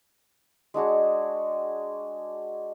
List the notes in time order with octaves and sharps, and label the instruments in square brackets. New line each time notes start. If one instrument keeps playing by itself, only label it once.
[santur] G#3 D4 F#4 G#4